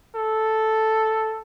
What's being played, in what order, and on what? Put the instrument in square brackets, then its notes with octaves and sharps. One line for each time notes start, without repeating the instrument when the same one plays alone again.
[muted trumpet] A4